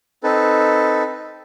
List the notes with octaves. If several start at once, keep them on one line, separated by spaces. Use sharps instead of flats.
C4 D#4 A4 B4